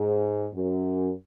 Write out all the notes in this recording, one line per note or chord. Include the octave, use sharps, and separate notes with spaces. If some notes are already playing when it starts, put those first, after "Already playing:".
Already playing: G#2
F#2